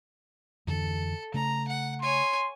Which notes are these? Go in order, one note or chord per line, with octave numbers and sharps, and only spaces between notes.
F2 D3 E3 A4
C#3 A3 A#5
F#5
C#5 G#5 C6